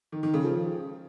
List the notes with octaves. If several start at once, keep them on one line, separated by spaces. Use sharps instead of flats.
D#3
D#3
C#3
F3